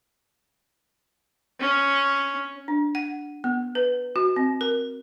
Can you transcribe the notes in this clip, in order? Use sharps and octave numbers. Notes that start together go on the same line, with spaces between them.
C#4
D4
F#5
B3
B4
F#4
C4
A#4